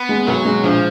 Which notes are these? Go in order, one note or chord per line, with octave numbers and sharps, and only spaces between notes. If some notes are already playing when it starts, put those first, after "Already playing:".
Already playing: B3
G#3
B1 F#3
G#3
A#1 F3